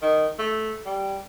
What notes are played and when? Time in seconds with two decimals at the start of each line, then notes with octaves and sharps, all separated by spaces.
0.02 D#3
0.39 A3
0.86 G3